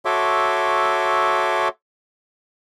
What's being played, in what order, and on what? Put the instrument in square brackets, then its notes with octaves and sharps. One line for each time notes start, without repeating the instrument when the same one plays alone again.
[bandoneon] F#4 A4 C#5 E5 C6 D6